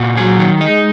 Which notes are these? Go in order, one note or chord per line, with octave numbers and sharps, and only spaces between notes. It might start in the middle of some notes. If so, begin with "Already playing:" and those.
Already playing: A#2 F#4
F#3 G#4
D#3
G#3 D#4